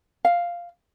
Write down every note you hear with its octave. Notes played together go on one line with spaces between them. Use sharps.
F5